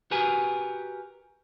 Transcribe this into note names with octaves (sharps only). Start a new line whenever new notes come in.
F#4 G4 A#4 B4 G#5